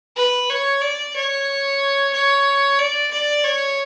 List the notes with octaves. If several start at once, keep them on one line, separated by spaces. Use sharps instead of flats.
B4
C#5
D5
C#5
C#5
D5
D5
C#5